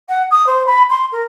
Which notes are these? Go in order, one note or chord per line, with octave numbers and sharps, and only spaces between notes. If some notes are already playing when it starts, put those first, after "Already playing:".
F#5
D#6
C5
B5
C6
A#4